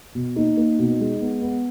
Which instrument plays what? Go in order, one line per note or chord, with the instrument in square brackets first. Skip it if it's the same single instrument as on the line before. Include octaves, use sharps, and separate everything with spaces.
[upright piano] B2
A#3 D#4
A#3
B2
G#3
B3
B3